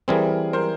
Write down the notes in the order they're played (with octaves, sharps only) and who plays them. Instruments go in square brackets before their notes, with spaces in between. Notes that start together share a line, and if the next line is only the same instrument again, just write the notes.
[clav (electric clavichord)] E3 G3 C4 [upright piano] G#4 A#4
[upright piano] A#4 C5